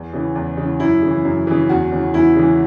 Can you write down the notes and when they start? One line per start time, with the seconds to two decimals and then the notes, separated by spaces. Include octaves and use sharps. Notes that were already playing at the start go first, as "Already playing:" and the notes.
Already playing: E2
0.13 C#3 E3
0.36 E2
0.58 C#3 E3
0.80 F#2 E4
1.02 C#3 E3
1.25 F#2
1.47 C#3 E3
1.69 E2 F#4
1.92 C#3 E3
2.14 E2 E4
2.36 C#3 E3